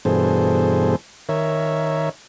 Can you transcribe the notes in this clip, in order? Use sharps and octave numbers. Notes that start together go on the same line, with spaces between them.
G2 B2 E3 G#4 A4 C5
D#3 A#4 C#5 E5